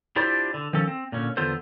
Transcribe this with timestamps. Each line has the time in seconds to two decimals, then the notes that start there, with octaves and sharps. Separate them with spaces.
0.16 D4 E4 F4 G4 C5 D5
0.54 D3
0.73 D#3 F3 C#4 A4
0.87 C4
1.12 A#2 D3 C#4
1.37 E2 D3 B3 F4 A4 C5